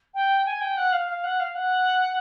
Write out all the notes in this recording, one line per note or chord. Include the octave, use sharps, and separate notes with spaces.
G5
G#5
G5
F#5
F5
F5
F#5
F5
F#5